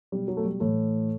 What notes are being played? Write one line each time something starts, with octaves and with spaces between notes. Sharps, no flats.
B2 F#3 G3
F#3
A3
G3
A2 E3 A3